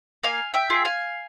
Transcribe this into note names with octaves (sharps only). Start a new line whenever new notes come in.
A#3 F5 G#5
E5 G5
F4 G#4
F5 G#5